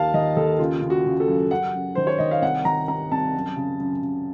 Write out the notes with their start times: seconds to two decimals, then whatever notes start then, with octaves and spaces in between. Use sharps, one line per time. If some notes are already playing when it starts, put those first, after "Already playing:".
Already playing: D#2 D#3 F5 A5
0.14 D#3 D#5
0.37 D#2 A4
0.59 C#3 F4
0.82 C#3
0.90 F#4
1.06 C#3
1.20 A4
1.28 F#2
1.51 F#2 F#5
1.74 F#2
1.95 D#3 C5
2.07 C#5
2.18 D#3 D#5
2.31 F5
2.42 C2 F#5
2.65 D#3 A#5
2.88 C3 A#5
3.12 C2 A5
3.34 F#2
3.57 C#3
3.80 F#2
4.03 C#3